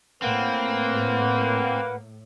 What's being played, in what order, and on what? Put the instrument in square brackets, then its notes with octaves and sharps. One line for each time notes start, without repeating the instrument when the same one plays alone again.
[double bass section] A2 [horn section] A#3 [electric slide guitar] C4 [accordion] B4 F#5